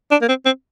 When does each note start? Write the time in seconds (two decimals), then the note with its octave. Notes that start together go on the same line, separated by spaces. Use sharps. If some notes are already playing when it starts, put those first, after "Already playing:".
0.11 D4
0.21 A#3
0.28 C4
0.46 C4